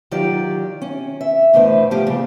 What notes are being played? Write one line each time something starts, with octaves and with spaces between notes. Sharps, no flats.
D#3 F#3 F4 G4 D5
C#4
E5
E2 A2 D3 B4 C5
F3 G3 A3 G4
A#2 C#3